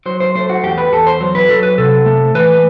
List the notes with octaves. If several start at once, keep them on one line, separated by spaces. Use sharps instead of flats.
F#3 C5
C5
A3 C5
F#4
E2 G4
B4
E2 A4
C5
F#3
B4
F#3 A4
B4
C3 A4
A3
E3 B4